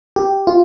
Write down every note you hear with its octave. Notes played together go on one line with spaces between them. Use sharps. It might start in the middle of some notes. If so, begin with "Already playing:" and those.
G4
F4